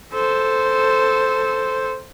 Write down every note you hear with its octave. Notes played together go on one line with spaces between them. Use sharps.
A4 C5